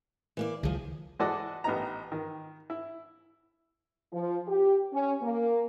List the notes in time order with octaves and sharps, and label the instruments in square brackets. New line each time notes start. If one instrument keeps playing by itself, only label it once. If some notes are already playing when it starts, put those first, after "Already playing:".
[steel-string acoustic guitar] E3 A#3 D5
[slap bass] C#2 D#3 F#3 [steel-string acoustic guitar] F3 G#4
[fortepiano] E3 G#3 F#4 A4 D5 D#5
A1 B3 D#4 A#5
D#3
E4
[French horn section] F3
G4
C#4
A#3